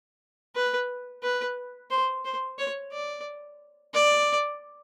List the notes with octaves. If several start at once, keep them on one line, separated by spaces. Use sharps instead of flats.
B4
B4
C5
C5
C#5
D5
D5